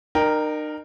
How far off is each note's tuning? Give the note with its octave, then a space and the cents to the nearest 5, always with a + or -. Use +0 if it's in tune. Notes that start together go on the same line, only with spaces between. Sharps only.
D#4 -40 A#4 +0 G5 +0